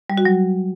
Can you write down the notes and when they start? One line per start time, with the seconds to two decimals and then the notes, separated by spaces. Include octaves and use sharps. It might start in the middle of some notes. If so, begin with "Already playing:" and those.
0.10 G3
0.17 F#4
0.25 F#3